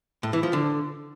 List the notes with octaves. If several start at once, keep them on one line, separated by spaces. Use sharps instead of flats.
A2
E3
F3
D3